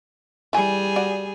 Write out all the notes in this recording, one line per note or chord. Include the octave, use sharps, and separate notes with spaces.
E3 G3 G#4 G#5
F#4 D5